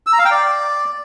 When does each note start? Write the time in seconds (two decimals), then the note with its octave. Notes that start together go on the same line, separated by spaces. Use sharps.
0.07 E6
0.13 A#5
0.19 F5
0.25 G5
0.31 D5